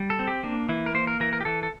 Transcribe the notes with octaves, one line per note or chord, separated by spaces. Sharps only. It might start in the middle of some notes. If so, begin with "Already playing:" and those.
Already playing: G3
A4
C4
G4
A#3 D4
E3 E4
A#4
A#3 C5
A#4
E3 A#4
A#4
G4
E3 A4
A4